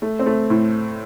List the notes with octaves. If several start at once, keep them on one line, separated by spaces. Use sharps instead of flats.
A3
C4
A3
A2